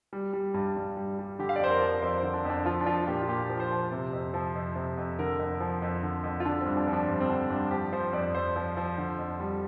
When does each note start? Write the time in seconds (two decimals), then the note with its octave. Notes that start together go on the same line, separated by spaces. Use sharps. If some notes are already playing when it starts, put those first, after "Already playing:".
0.13 G3
0.33 G3
0.54 G2
0.76 G2
0.97 G3
1.18 G3
1.39 D3 G4
1.49 F5
1.56 D5
1.59 F2 C5
1.70 A#4
1.81 F3
2.02 F2 C5
2.18 C5
2.23 D3
2.34 D4
2.45 F2 D4
2.65 F3 F4
2.81 D4
2.86 F3 F4
3.07 A#2 G4
3.22 F4
3.28 A#2 G4
3.50 F3
3.60 C5
3.71 F3
3.92 C3
4.13 F2
4.34 F3
4.55 F2
4.76 C3
4.98 F2
5.19 D3 A#4
5.39 F2
5.60 F3
5.82 F2
6.03 D3
6.24 F2
6.40 F4
6.45 D3 D4
6.61 C4
6.66 G2
6.77 D4
6.87 F3
6.93 D4
7.08 G2
7.20 C4
7.29 D3 D4
7.50 G2 D4
7.71 F3 G4
7.92 F3 C5
8.13 F2 D5
8.35 F2 C5
8.56 F3
8.77 F3
8.98 D3
9.19 F2
9.40 G3